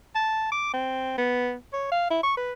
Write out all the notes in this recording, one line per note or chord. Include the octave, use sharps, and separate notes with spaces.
A5
D6
C4
B3
C#5
F5
E4
C#6
B4